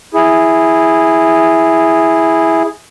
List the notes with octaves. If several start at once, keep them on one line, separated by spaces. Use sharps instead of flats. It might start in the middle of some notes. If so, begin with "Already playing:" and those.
E4 G#4